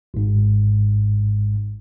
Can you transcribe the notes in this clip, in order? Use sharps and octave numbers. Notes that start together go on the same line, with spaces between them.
G#1 G#2